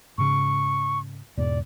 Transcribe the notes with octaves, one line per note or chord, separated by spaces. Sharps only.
G#2 C#3 C#6
E2 G#2 B2 D5